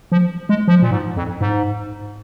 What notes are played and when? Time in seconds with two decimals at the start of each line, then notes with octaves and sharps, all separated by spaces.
0.12 F3
0.49 G#3
0.68 F3
0.82 A#2
0.91 G#2
1.16 F2
1.41 G#2